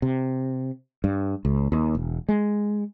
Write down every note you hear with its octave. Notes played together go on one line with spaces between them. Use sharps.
C3
G2
C#2
D#2
E1
G#3